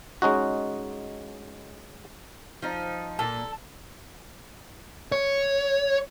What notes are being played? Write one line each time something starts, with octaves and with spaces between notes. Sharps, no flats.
G#3 C#4 D#4 F#4
F3 D#4
A#2 A4
C#5